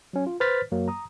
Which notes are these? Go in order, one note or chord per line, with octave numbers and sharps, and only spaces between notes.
F#3 C#4
F4
B4 C5 F6 A6 B6
F#2 F#3 A#3
A#5 D#6